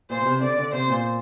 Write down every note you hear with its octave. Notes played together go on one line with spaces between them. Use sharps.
A#2 C5
A#2
C3
D3 D5
D3
C3 C5
A#2